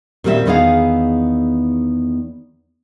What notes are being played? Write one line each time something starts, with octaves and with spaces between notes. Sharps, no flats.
A#2 D#3 G3 G#3 C4 E5
E2 D#3 B3 D#4 G#4 F5